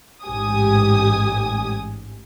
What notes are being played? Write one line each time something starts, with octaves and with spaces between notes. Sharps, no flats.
A1 G#2 G4 G#5 D#6